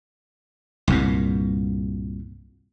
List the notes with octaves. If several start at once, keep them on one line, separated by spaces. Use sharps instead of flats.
C2 G2 A#2